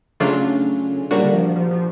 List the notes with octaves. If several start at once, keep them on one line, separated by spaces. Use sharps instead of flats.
C#3 F#3 A3 D4 F4
A#2 C#3 G3 A#3 D4 F#4
D3
F3
F3
F3
F3